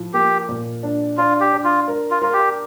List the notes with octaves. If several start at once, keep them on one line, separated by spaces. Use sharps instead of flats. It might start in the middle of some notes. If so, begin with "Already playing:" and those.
Already playing: A2 F3
A#3 G4
A#2
D4
D4 F4
G4
D4
F4
A#4
F4
F4 A#4
G4